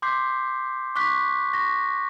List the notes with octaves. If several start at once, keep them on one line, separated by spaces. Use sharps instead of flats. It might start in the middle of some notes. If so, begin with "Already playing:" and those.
C6 D6 G6 B6 C7
C#6 D6 F#6 B6
C#6 A#6